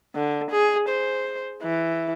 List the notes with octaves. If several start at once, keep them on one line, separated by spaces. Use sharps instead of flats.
D3
G#4
C5
E3